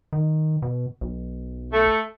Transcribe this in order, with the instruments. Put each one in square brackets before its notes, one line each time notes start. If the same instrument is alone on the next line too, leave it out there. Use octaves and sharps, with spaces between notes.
[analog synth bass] D#3
B2
B1
[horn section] A3